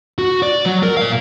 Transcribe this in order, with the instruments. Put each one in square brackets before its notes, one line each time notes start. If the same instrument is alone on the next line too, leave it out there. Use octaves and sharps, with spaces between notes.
[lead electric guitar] F#4
D5
F#3
A#4
A#2 F5